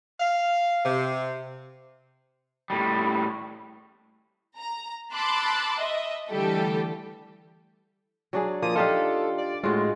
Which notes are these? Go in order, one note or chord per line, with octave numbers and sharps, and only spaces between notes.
F5
C3
A2 G3
A#5
A5 B5 C6 D6 E6 F#6
D#5 E5
D3 E3 G3 A3 G4 A4
F#3 D4 G#4
F3 A#3 D#6
D4 D#4 F4 G4 A4 F5
D5
A2 G#3 F4 F#4